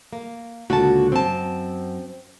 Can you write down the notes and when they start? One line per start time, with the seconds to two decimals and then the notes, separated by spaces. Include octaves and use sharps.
0.13 A#3
0.70 C#2 A#2 D3 F#4 A5
1.12 F#2 C4 A5